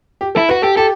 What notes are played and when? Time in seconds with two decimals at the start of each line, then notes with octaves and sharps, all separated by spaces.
0.21 G4
0.35 E4 A4
0.49 F#4 B4
0.62 G4 A4
0.77 G4 A4